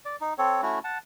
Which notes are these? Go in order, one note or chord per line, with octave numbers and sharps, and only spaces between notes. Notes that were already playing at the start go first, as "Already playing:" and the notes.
D5
D#4
C4 A4 C#5
A3 C#4 E4 F#4
F#5 A5